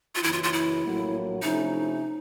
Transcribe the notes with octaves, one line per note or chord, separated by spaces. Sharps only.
F4
F#1 F#2 C#3 E3 E4
F4
F4
E4
A#1 A2 F#3 A#3
C3 F3 A3 C#4 D#4 E4